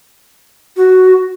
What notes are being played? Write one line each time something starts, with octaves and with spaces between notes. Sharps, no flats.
F#4